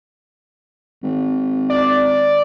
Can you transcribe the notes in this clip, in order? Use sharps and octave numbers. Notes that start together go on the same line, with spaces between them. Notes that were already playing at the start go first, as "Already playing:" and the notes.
G#1
D5